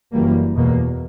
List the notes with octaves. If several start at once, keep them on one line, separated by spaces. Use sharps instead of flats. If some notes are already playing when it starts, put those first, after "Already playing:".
F#1 F#2 E3 G3 A#3
E2 B2 A#3